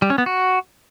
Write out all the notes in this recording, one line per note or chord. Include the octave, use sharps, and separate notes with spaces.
G3
C#4
B3
F#4